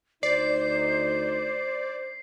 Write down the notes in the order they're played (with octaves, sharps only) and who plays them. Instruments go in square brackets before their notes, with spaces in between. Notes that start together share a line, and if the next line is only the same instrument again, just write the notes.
[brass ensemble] D2 D#4 [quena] C5 [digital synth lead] D5 [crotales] C7